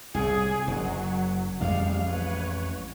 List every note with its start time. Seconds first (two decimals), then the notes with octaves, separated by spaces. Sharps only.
0.15 C2 A2 G#4
0.68 F#1 F#3
1.61 A1 F2 G3 G#3 F5
2.07 B4 C#5